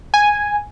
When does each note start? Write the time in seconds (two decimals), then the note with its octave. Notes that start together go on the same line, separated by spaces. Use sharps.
0.14 G#5